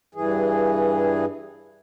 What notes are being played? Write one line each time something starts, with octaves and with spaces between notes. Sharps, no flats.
G2 E3 G#4